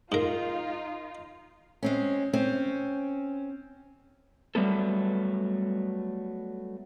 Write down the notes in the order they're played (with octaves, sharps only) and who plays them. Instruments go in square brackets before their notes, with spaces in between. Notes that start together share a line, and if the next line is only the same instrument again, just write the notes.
[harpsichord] G#2 A#4 [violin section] D#4 F4
[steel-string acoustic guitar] G#3 C4 C#4
C4 C#4
[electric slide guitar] F#3 G3 A3 B3 A4